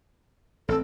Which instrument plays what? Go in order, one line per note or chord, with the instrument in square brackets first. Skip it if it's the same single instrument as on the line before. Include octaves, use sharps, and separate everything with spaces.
[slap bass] A1 C4 [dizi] A4